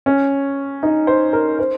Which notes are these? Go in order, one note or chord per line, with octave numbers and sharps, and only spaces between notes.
C#4
D#4
C5
A#4
C5